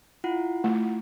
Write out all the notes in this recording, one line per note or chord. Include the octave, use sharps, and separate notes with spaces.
E4 F4 F#5
A3